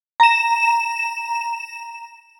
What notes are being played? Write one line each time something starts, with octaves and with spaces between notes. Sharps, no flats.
A#5 E7